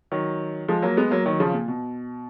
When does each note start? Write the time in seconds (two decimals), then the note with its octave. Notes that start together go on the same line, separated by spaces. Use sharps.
0.12 D#3 F#3
0.68 F3 G#3
0.82 F#3 A#3
0.97 G#3 B3
1.11 F#3 A#3
1.26 D#3 F#3
1.40 C#3 F3
1.53 A#2
1.68 B2